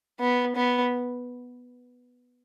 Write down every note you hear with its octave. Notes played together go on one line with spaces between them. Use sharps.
B3
B3